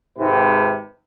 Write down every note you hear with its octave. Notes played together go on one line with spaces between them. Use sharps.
G#1 G#2 C3 B4